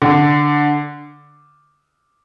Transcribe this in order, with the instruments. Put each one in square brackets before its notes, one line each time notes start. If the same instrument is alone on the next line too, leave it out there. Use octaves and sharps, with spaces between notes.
[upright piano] D3